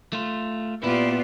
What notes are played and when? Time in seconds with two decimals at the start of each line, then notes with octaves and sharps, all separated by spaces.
0.13 A3 F4
0.83 A#2 B3 E4 F4 G4 D5